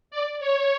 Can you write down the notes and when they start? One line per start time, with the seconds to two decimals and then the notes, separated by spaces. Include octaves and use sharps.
0.11 D5
0.40 C#5